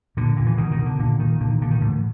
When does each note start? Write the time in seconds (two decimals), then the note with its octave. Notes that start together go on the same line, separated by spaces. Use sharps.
0.17 A#2 D3
0.37 A#2
0.47 E3
0.57 B2 D#3
0.71 D#3
0.79 B2
0.86 D3
0.99 A#2 D3
1.19 A#2 D#3
1.40 A#2 D3
1.51 D#3
1.61 A#2 D3
1.71 D#3
1.81 A2 D3 E3